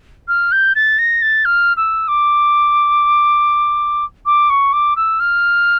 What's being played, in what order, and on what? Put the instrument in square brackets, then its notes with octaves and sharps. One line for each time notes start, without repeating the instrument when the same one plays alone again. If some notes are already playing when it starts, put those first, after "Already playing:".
[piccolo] F6
G6
A6
A#6
A6
F6
E6
D6
D6
C#6
D6
E6
F6